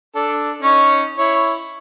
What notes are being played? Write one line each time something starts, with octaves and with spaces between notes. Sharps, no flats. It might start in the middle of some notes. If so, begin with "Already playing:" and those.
D4 A4
C#4 D#4 C#5
E4 C#5